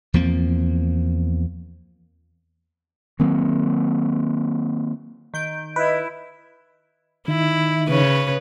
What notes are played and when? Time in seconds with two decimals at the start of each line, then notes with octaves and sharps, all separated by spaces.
0.14 E2 F3 A#3 C4
3.20 D#3 F#3 A#3 C4
5.34 D#3 G6 D7
5.76 E4 B4 D#5
7.28 D#3 E4
7.88 C#3 B4 C#5